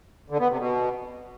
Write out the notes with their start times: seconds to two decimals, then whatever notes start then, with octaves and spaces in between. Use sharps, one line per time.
0.30 D3
0.39 B3
0.49 C3
0.58 B2